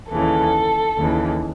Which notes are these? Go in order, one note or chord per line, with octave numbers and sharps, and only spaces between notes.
D#2 C#3 E3 A4
D#2 C#3 E3